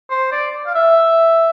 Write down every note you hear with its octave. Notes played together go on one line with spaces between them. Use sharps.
C5
D5
F5
E5